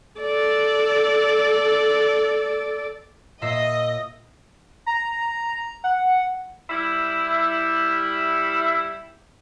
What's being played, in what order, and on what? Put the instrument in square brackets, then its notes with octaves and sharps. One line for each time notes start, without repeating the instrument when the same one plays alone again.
[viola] A4 D5
[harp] A#2 E5 C7 [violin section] D#5
[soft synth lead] A#5
F#5
[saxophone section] G3 E4